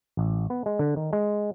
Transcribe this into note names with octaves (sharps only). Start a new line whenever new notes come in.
A1
B3
G#3
D3
D#3
G#3